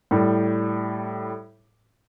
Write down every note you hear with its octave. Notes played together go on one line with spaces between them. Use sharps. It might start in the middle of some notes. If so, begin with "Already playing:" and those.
A2 G3